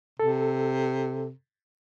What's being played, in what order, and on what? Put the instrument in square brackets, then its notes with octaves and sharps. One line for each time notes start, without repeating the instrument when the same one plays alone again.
[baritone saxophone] C3 [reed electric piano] A4